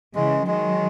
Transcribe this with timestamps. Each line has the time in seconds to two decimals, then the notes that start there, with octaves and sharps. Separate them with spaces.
0.15 C#3 E3 G#3
0.46 D#3 F#3 G#3